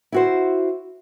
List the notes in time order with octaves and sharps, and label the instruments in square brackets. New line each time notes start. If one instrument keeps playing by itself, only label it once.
[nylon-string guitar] E4 F#4 C5